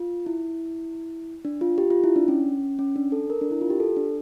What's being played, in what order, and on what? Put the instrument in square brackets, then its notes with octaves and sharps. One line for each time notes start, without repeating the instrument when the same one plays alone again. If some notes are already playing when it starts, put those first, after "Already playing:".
Already playing: [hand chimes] F4
E4
D4
F4
G4
F4
E4
D4
C#4
C#4
D4
A4
A#4
D4
E4
F4
G4
A4
D4